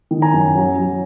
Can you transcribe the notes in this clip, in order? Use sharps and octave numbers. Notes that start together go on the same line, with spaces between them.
D#3
G#5 A#5
F#2
F#3
F#3